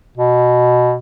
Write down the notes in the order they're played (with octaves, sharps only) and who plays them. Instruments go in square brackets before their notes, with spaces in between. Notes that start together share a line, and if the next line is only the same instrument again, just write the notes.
[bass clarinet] B2